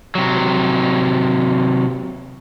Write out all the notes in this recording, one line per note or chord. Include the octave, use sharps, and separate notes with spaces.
C3 F#3